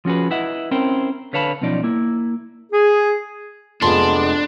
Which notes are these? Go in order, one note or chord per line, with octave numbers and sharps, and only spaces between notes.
F3 C#4 F#4 G#4 B4
E4 B4 D#5 E5 F#5
C4 C#4 E4 A#4 C5 G5
D3 B4 C#5 F5 A5 B5
B1 B2 F3 C#4 D#4 D5
A#3 E4
G#4
F1 G#3 B3 D4 F4 A5 C6